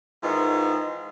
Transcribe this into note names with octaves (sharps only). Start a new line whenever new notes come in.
G#2 D#3 E3 D#4 F4